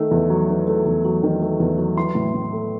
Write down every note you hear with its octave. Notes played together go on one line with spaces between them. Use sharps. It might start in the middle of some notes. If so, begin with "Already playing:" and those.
Already playing: D#3 A3
E2
F#3
D#3
A3
E2
F#3
D#3
A3
E2
F#3
E3 C6
A2
A2
A3